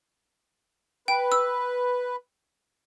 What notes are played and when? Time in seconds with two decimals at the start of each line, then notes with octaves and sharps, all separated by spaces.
1.08 B4 G5
1.32 E6